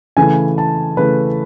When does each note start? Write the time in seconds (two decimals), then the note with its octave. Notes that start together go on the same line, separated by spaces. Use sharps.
0.17 C#3 E3 A3 G#5
0.58 A5
0.97 C#3 E3 A3 B4